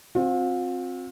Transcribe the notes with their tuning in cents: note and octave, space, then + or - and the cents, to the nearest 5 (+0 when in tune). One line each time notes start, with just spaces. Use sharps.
C4 +10 F4 +40